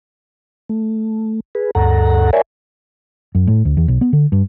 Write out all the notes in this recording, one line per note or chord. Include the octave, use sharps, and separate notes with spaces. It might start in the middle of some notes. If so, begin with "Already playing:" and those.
A3
G#4 B4
D2 G2 A4 F#5 A#5
A#4 C#5 D5 E5 G#5
F#2
A2
D2
E2
B1
B3
D3
G2